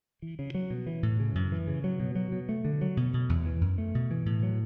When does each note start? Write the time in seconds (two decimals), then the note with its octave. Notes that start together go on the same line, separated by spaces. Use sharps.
0.22 E3
0.39 C#3
0.55 F#3
0.70 B2
0.87 E3
1.03 A2
1.20 C#3
1.35 F#2
1.52 E3
1.67 C#3
1.84 F#3
2.00 B2
2.16 F#3
2.32 B2
2.49 A3
2.65 D3
2.81 F#3
2.97 B2
3.13 B2
3.29 E2
3.46 E3
3.61 F#2
3.78 A3
3.95 B2
4.11 E3
4.26 A2
4.43 F#3